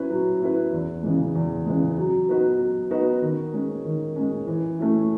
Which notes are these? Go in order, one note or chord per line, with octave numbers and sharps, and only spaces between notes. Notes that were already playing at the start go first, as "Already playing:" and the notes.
Already playing: F#3 C#4 E4 B4
F#3
C#4 E4 B4
E2
C#3 E3 G#3
E2
C#3 E3 G#3
F#3
B3 D#4 F#4 B4
F#3
B3 D#4 F#4 B4
D#3
G#3 C#4
D#3
G#3 C#4
E3
A3 C#4 E4